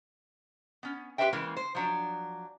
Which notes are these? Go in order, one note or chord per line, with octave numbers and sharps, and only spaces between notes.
B3 C#4
G4 G#4 B4 C5 E5 G5
C#3 E3 G#3 A#3
C5
F3 F#3 D4